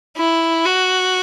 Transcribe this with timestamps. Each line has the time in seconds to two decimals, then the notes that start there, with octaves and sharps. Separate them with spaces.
0.17 E4
0.65 F#4